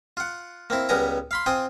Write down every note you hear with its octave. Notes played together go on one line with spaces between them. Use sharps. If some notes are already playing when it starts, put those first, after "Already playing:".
F4 F#5
A#3 C4 E4
C#2 G3 B3 A#4 G#5 A#5
F5 B5 C6
C4 F4 G5 G#5 D#6